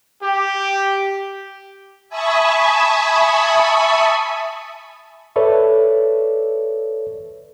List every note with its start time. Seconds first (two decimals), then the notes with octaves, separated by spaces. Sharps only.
0.23 G4
2.09 E5 G#5 A5 B5 C#6 D#6
5.36 A4 B4 C#5 D5 E5